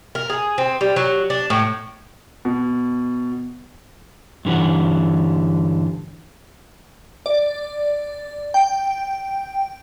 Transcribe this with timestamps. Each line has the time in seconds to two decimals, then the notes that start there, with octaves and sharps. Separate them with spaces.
0.15 A#4
0.30 G#4
0.58 C4
0.81 G3
0.96 F#3
1.30 D4
1.50 A2
2.45 B2
4.45 G2 D3 E3 G4 F#5
7.26 D5
8.54 G5